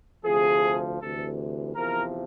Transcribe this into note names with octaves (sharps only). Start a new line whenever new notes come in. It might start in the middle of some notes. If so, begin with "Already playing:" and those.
D2 C3 F3 G#4
D2 C3 E3 A4
E2 C3 F3 A#4